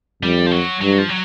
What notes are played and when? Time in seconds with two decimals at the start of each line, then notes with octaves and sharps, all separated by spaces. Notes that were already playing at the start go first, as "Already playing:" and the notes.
0.23 F2 G3
0.46 F3
0.51 F#3
0.81 G2 F#3
0.98 F3
1.09 F#3